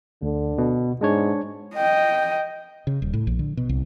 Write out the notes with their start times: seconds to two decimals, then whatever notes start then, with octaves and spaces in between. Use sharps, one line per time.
0.22 D2 D3
0.58 B2
1.01 G#2 G#3 D4 C#5
1.74 D#5 G5
2.87 C#3
3.02 D#1
3.13 A2
3.27 A#1
3.39 D3
3.57 B2
3.69 C2